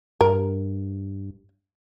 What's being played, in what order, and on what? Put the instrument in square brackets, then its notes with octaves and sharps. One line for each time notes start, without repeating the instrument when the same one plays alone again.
[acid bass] G2 [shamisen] A#4